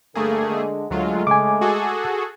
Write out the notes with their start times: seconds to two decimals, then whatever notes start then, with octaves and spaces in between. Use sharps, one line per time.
0.15 G2 D3 A3 A#3 G#4 A4
0.48 D3 G#3
0.90 D2 F#3 G#3 A3 F4
1.27 C#3 G#5 D6
1.61 F#4 G#4 A4